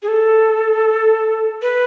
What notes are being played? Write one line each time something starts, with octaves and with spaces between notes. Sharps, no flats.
G#4
A4
B4